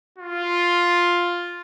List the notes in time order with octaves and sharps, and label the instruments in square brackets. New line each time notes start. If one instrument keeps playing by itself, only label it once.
[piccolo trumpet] F4